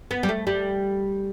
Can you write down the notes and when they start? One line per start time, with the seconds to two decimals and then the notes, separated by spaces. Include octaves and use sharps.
0.11 B3
0.23 G3
0.29 A3
0.47 G3